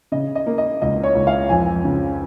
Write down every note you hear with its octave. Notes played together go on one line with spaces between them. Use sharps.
C#3 D#5
D#5
A#3
D#5
C#2 D#5
C#5
C#2
F5
F2 G#5
C#3